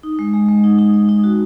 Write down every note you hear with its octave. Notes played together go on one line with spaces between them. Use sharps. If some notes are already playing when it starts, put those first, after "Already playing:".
D#4
G#3
G#3
G#3
D#4
D#4
D#4
D#4
F#4